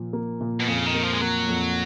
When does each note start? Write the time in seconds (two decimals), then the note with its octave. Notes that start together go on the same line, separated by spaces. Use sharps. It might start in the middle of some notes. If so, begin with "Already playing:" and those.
Already playing: A#2 F3
0.13 A#3
0.41 A#2
0.60 B2
0.67 F2 C#3
0.86 D#3
0.95 A#3
1.03 F3
1.13 G#3
1.21 F#3 A#3
1.49 F2